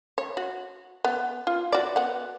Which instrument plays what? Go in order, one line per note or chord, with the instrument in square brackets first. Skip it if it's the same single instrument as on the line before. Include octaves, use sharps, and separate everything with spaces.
[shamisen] C#5
F#4
B3
F4
F#4 D5
B3 F#5